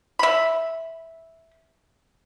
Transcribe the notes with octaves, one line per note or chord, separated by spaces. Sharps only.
E5 B5